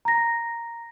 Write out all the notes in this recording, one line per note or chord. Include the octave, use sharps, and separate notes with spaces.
A#5 A#6